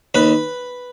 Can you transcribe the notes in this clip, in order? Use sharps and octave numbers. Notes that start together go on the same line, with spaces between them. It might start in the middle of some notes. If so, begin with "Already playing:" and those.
D#2 B4 B5